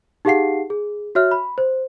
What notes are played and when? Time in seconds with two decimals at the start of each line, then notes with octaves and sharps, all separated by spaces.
0.25 D#4 G4 G#4 F5 F#5 C7
0.70 G#4
1.15 F#4 C#5 E5 F6
1.31 B5
1.58 C5